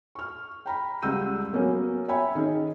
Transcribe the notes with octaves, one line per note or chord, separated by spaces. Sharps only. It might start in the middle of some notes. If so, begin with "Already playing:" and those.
C#6 F6
G5 A#5 B5
C#2 G3 F#5 E6 G6 D#7
F#3 A#3 B3 C#4
C#5 E5 G5 G#5 B5
D#3 C#4 D#4 G#4